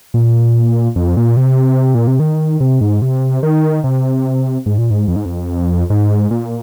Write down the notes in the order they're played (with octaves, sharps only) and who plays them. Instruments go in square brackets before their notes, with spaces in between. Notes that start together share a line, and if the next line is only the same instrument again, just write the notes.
[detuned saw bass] A#2
F2
A#2
C3
A#2
C3
D#3
C3
G#2
C3
D#3
C3
G#2
A#2
G#2
F2
G#2
F2
G#2
A#2